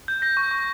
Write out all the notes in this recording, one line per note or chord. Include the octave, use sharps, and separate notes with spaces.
G6
G6 A#6
C#6
C#6